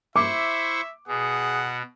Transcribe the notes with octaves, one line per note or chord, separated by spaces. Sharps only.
E4 C5 E5 C#6 D6
B2 G#4 F#5